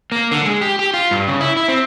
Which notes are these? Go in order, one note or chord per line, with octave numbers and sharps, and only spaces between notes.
A#3
D3
G#3
G4
G4
F4
G2
C#3
E4
E4
C4